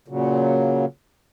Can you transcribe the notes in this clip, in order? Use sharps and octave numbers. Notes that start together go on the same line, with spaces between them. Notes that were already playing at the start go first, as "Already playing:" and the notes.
A#2 C#3 F#3